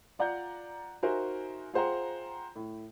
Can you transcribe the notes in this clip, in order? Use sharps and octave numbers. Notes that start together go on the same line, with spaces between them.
F4 D5 F#5 A#5 G6
D#4 F#4 A#4 C5 E5 G#5
F4 G#4 C5 F#5 G5 A#5
A2